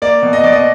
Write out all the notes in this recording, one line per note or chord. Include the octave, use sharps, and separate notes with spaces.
A#3 D5
B2
D#5
B2 D5
D#5